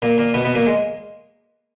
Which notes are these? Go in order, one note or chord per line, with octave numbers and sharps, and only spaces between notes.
A#2 A#3
A#2 A#3
B2 B3
B2 B3
A#2 A#3
G#3